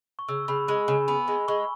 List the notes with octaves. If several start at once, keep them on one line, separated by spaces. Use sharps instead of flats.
C#6
C#3 E6
C#3 B5
G#3 B5
C#3 G#5
B3 B5
G#3
G#3 C#6